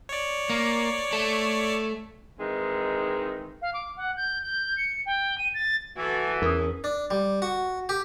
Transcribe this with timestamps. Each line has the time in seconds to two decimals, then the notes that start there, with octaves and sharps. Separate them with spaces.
0.09 C#5 D5
0.50 A#3
1.13 A3 A4
2.39 D#3 E3 G#3 C4 D#4
3.62 F5
3.74 D6
3.97 F#5
4.17 G6
4.43 G6
4.77 C#7
5.06 G5
5.38 D#7
5.54 A6
5.97 E3 F#4 A4
6.42 E2 C#4 A#4 D#6
6.84 D4
7.11 G3
7.42 F#4
7.89 G4